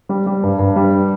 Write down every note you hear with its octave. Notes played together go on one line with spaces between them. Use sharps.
G3
G3
G2
G2
G3